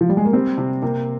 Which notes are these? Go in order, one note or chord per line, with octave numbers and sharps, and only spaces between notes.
F3
G3
G#3
A#3
G3 C4
C3
C3 A#3